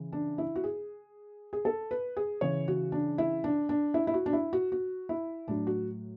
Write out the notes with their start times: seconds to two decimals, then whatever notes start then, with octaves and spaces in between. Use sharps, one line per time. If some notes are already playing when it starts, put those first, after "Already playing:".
Already playing: C#3 E3
0.12 D4
0.38 E4
0.56 F#4
0.64 G#4
1.53 G#4
1.65 A4
1.91 B4
2.17 G#4
2.41 C#3 E3 C#5
2.68 F#4
2.92 D4
3.18 E4
3.44 D4
3.69 D4
3.94 E4
4.07 E4
4.14 F#4
4.26 D4
4.33 E4
4.53 F#4
4.72 F#4
5.09 E4
5.48 A2 F#3 D4
5.67 F#4